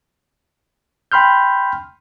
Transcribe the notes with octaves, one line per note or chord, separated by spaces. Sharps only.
G5 B5 C6 F6 G6